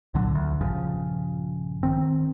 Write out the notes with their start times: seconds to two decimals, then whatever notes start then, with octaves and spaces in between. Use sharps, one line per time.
0.14 C2 A#2 D3 F#3
0.35 D2
0.61 A#1 G2 C#3 F3
1.83 D#3 C4